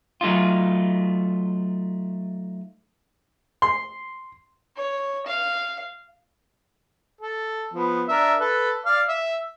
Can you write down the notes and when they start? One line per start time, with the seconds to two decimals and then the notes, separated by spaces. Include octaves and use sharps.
0.21 F#3 A3 D#4 F4
3.62 C6
4.77 C#5
5.27 F5
7.21 A4
7.73 F3 B3
8.08 D4 A#4 E5
8.40 A4 B4
8.86 D5 F5
9.08 E5 E6